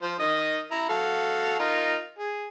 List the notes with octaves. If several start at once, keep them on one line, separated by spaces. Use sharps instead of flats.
F3 C5
D#3 D#5 D#6
E4 A#5
F#4 A4 F5
D#4 F4 A#4
G#4